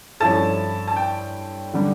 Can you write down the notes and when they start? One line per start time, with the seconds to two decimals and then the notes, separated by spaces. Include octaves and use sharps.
0.20 G2 F3 C#4 E4 A4 A5
0.88 A5
0.96 G5
1.74 D3 G3